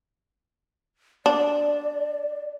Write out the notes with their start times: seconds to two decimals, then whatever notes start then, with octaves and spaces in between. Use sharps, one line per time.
1.26 D4 D5